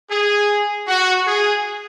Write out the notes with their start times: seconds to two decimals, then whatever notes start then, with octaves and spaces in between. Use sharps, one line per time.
0.10 G#4
0.87 F#4
1.26 G#4